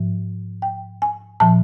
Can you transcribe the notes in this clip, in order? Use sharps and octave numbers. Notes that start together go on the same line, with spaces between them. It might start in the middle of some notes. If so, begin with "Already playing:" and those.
Already playing: G#2 F3
G5
G#5
A#2 F3 A5